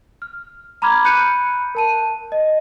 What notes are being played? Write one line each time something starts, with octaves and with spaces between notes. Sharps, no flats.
F6
A#5 B5 D6 F6 G#6
B5 F#6 G6 C#7 D#7
A#4 A5 D#7
D#5